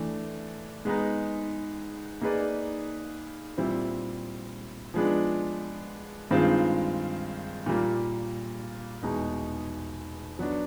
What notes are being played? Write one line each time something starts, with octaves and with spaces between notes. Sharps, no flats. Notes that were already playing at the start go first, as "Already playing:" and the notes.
Already playing: E3 A3 D4
G#3 B3 D#4
A#3 D#4 G#4 B4 D5
A#2 G3 C4 E4
F3 G#3 B3 D4
G2 D#3 G#3 C4 F4
A#2 G3 A#3
E2 B2 G#3 B3 D#4
F#3 B3 D4